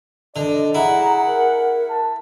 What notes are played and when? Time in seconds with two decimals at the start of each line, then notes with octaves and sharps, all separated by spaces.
0.36 D3 D5 D#5
0.75 E4 G#4 F#5 A#5
1.25 A#4
1.89 A5